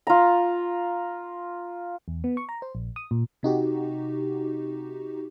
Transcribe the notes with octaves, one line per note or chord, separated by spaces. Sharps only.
F4 A#5
E2
B3
C#6
A#5
C5
A#1
D#6
A#2
C3 D#4 F#4 G4